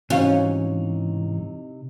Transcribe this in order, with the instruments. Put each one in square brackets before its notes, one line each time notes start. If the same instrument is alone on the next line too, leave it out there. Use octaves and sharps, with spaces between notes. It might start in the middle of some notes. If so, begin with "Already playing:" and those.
[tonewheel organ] G#2 E3 [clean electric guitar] C3 D#4 [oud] C#4 [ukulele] F#4 C5 F5